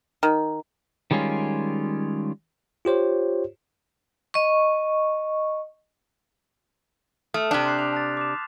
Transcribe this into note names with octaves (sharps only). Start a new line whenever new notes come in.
D#3
D#3 G3 G#3 C#4 F4
F4 G4 C5 C#5
D#5 C#6
A3 D#6 F6
C3 D4 D6 F#6 B6
C6 G6 C7
F7
A5 F#6 A6
D6 E7